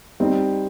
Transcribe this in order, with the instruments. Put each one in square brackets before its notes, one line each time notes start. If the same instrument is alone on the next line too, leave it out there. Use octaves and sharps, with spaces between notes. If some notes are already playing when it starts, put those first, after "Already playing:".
[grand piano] G3 C4 D#4